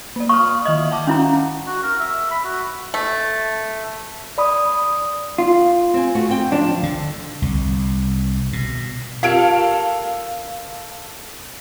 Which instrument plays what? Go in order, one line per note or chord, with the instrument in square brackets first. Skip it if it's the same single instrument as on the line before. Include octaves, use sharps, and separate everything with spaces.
[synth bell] A#3 D5
[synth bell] F5 D#6 F6 [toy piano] C#6
[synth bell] D#3 E5 F#7 [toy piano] D#5
[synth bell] F#5 A5 D6
[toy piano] C#4 E4 A#5 [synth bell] F5 F#5
[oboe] F#4
A#4
E5
B5
F#4
[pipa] A3
[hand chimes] D5 B5 D#6
[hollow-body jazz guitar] F4
[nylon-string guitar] C4 G#5
A3 F#4
D2 C4 G5
[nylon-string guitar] F3 [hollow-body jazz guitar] D4
[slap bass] D3
C2
B2
[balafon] F4 G4 [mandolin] A4 A#4 C#5 [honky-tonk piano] F5 D7